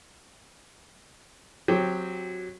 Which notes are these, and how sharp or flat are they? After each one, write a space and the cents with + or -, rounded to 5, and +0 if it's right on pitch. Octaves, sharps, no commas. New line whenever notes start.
F#3 -10 C4 +5 G4 +0